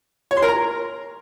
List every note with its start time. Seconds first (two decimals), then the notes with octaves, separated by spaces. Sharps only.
0.31 C#5
0.37 C6
0.42 A#4
0.48 A#5